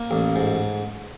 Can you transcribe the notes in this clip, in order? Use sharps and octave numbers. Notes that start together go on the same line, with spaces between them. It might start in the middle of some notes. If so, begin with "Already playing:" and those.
Already playing: A#3
A1
G#2